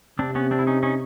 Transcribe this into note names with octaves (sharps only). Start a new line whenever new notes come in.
C3 C4 D4
B3 C#4
C4 D4
E4
C#4 D#4
C#4 D#4